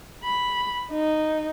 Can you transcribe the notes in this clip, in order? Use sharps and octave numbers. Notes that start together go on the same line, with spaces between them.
B5
D#4